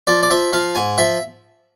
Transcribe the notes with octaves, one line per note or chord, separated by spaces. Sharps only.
F3 D5
D5
F3 E5
F3 F5
G#2 G#5
F3 E5